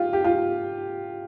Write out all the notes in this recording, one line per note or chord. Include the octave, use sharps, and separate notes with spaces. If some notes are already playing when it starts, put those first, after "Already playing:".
Already playing: F4 G4
G4
F4